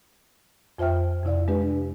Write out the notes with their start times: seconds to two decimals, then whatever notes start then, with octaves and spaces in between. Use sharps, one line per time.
0.78 F2 F4 C5 E5 G5 F6
1.24 F2 C3 E4 D5 F5
1.48 G#3 D4 G4 B4